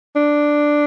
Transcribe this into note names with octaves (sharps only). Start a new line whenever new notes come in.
D4